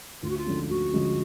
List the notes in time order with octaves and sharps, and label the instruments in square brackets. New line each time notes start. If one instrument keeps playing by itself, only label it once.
[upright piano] D2 [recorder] F4
[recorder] F#4
F4
[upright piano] D3 F3 G#3 C#4
[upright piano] D2 [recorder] F#4
[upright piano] D3 F3 G#3 C#4